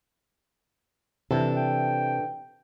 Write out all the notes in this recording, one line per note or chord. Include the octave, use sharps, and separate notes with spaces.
C3 E3 D4 A4
G5